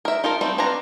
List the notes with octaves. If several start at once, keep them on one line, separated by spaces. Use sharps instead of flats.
A#4 E5
D#4 F4 A4 A#4
G3 A3 C4 D#4
C4 D4 F4 B4 A#5